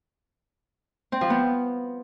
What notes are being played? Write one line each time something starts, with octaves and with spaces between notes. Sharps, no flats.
C4
F3
B3